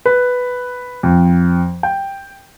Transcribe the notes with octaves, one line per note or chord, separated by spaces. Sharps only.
B4
F2
G5